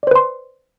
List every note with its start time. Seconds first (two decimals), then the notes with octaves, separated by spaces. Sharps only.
0.03 D5
0.07 C5
0.11 B4
0.16 C6